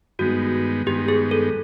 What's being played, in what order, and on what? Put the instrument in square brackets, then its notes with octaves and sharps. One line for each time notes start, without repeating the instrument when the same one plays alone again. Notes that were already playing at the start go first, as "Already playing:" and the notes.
[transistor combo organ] G2 D#3 G#3 B3 [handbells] F#4
[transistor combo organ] G2 D#3 G#3 B3 [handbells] G4
[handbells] G#4
A4